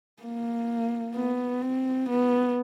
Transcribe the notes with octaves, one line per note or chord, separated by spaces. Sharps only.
A#3
B3
C4
B3